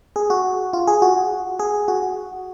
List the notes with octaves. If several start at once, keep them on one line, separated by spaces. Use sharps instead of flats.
G#4
F#4
F4
G#4
F#4
G#4
F#4